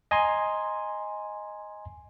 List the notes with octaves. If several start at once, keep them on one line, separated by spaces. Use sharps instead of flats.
D#5 G#5 A#5 C6